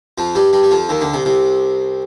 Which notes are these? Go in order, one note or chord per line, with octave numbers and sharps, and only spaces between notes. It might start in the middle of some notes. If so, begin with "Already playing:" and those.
F2 F3
G2 G3
G2 G3
G3
F2 F3
D#2 D#3
D2 D3
C2 C3
C2 C3